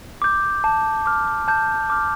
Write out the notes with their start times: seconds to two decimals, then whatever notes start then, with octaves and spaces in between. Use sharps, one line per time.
0.22 D6 G6
0.64 A5
1.06 D6 F6
1.48 A5 G6
1.90 D6 F6